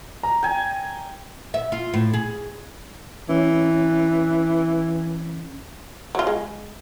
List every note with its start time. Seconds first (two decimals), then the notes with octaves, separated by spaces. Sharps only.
0.23 A#5
0.43 G5 G#5
1.54 E5
1.72 F4
1.94 A2
2.13 G#4
3.29 E3 C#4
6.15 F#3 F4
6.27 G#3